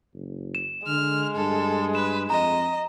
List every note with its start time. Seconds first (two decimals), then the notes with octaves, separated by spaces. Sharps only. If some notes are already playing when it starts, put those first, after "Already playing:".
0.14 F#1
0.55 E7
0.87 D3 G#3 F6
1.36 G2 A4
1.95 B4 E7
2.30 F2 D#5 A#5